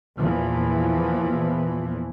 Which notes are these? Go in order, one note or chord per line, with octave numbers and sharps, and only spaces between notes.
E2 A#2 E3 F3